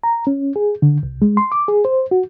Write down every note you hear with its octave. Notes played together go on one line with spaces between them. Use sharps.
A#5
C#4
G#4
D3
C2
G#3
C6
D6
G#4
C5
F#4